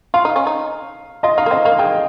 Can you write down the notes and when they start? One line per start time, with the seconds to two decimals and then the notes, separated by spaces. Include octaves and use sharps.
0.14 F4 F5
0.25 D#4
0.36 C#4
0.47 D#4
1.23 F4 D#5
1.38 D#4 F5
1.46 A#3
1.51 C4 D#5
1.65 A#3 F5
1.78 G#3 G5